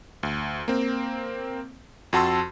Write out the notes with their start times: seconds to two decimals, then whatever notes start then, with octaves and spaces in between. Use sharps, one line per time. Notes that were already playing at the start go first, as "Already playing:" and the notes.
0.23 D2
0.68 A#3 C4
2.13 F2 F#4 A5 C6 E6